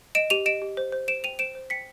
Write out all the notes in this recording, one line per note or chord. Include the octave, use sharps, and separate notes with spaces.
D#5 D7 E7
G4 D#7 F7
D#5 D7 E7
G4
C5
C5
C5 D7 E7
G5 D#7 F7
C5 D7 E7
C5
G5 B6 C#7